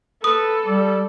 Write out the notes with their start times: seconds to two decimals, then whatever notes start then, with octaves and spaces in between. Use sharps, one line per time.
0.24 A4 B4 D#6
0.66 G3 D5